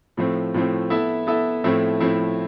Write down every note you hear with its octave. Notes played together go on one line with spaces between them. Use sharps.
A2 F3 A3 C4
A2 F3 A3 C4
B3 E4 A4 E5
B3 E4 A4 E5
A2 F3 A3 C4 E4
A2 F3 A3 C4 E4